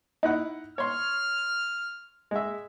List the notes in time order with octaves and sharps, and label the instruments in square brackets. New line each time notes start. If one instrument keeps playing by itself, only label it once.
[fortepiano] D#4 E4 F#5
[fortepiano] C#5 C6 [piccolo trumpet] F6
[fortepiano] G#3 E5